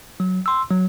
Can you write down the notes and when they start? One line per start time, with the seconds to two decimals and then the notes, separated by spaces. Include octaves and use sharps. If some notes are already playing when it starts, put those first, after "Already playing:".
0.20 F#3
0.46 C6 E6
0.71 F#3